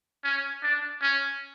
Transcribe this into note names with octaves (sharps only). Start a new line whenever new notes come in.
C#4
D4
C#4